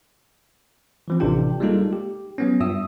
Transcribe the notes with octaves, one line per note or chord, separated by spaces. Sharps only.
E3 F3 C4
A1 C3 D4 F4 G4 G5
G3 G#3 A#3 D#4 F4 A4
G4
F#3 B3 C#4
G2 F4 E5 D#6 E6